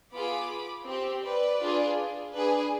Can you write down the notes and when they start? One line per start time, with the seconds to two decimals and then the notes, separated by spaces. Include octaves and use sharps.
0.14 B3 F4 G#4 B5 D6
0.88 C4 G4
1.24 B4 D5
1.61 D4 F4 G#4
2.34 D4 G#4 B4